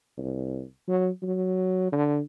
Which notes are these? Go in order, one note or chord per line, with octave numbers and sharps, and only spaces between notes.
C2
F#3
F#3
D3